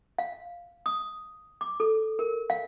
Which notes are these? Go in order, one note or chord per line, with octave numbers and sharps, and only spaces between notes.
F5
D#6
D6
A4
A#4
F5